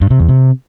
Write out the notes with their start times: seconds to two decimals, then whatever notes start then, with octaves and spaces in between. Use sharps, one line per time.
0.01 G2
0.10 C3
0.20 E2
0.29 C3